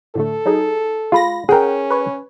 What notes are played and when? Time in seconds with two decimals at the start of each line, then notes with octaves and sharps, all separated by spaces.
0.15 A2 D3 A3 A4
0.46 F#3 D#4 G#4
1.12 G#3 F4 B5 A#6
1.49 C#4 G#4 A#4 F#5 G5
1.90 B4 C#5